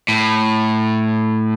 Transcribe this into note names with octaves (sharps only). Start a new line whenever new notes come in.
A2